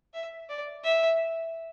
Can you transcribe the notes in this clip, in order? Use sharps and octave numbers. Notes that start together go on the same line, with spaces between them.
E5
D5
E5